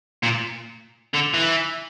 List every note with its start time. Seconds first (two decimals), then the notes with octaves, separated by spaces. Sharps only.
0.23 A#2
1.14 D3
1.34 E3